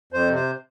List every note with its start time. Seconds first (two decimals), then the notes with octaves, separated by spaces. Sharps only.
0.13 F2 C5
0.29 C3
0.35 C5